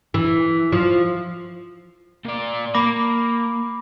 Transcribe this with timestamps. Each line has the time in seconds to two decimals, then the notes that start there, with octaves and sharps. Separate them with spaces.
0.14 E3
0.72 F3
2.25 A#2 D5
2.75 A#3 B5 D6 A#6